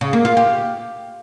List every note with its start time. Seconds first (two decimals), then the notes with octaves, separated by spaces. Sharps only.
0.01 C#3
0.13 A#3
0.25 F4
0.37 G4